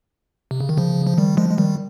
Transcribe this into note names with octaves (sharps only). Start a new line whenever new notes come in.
C3
C#3
D#3
C#3 F3
F3
D#3 G3
F3 G#3
G#3
D#3 G3